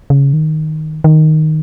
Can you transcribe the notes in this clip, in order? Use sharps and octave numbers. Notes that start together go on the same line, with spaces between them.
C#3
D#3
D#3